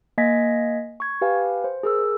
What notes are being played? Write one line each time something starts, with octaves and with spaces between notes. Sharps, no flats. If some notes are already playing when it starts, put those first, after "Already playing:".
A#3 D#5 G#5 G#6 A#6 B6
C#6 G#6
G4 B4 F5 G#5
C5
G#4 A#4 E6